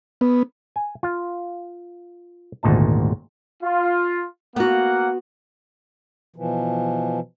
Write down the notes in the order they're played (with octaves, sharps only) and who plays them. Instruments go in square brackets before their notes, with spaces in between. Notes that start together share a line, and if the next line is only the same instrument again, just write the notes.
[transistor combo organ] B3
[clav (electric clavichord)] G#5
F4 F5
G#1 D2 A#2 D#4 A5
[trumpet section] F4
[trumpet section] A#3 F#5 [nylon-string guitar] B3 F#4
[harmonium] B2 E3 F3